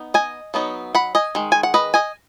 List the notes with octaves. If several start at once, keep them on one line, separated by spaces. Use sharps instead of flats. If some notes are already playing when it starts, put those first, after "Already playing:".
Already playing: B3 D#4
D#5 G#5
F#3 B3 D#4
F#5 B5
D#5 G#5
D#3 G#3
G#5
F#5
B4 D#5
D#5 G#5